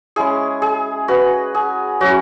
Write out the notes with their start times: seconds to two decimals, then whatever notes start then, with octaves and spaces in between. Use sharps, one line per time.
0.16 G#3 C#4 E4 G#4
0.62 G#4
1.08 F#4 B4
1.55 G#4
2.00 F#3 C#4 E4 F#4